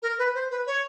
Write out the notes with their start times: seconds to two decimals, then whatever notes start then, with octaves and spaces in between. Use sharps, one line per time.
0.02 A#4
0.18 B4
0.34 C5
0.51 B4
0.67 C#5